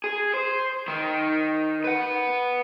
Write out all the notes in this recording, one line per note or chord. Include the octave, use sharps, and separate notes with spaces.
G#4
C5
D#3 D#4
B4 F#5